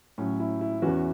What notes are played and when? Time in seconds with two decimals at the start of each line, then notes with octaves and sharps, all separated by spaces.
0.18 A2 F#3 C#4
0.40 E4
0.61 E4
0.82 E2 E3 C#4 F#4